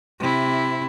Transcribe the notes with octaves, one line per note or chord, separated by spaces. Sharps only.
C3 E4